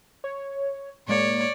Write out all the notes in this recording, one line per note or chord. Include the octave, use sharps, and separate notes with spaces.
C#5
A2 G#3 A#3 C#5 D5